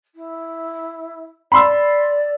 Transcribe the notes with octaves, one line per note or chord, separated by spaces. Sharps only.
E4
D5 B5 C6 E6